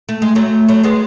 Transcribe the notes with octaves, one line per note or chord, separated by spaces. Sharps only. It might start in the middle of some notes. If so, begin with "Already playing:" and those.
A3
G#3
F#3 A3
F#3 A3
G#3 B3